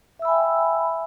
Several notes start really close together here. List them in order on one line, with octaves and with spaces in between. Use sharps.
E5 E6 B5 G#5 G5